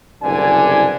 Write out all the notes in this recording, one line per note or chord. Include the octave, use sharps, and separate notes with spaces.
F#1 C2 G2 D3 D5 G#5